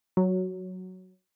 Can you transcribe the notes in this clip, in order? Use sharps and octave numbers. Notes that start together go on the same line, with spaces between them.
F#3